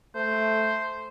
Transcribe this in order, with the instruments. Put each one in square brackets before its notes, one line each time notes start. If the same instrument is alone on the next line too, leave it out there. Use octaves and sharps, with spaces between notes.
[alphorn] A3 [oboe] C5